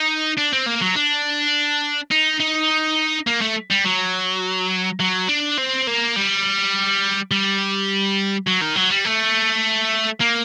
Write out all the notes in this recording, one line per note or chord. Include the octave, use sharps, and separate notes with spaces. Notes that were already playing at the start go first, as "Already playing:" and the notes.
Already playing: D#4
D4
C4
A#3
F#3
D4
D#4
D#4
A#3
A3
G3
F#3
F#3
D4
C4
A#3
G3
G3
F#3
D#3
F#3
G3
A3
A#3